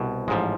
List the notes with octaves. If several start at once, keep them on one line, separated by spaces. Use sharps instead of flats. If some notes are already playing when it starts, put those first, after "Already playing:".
Already playing: C2 B2
A1 G#2 F3 G#3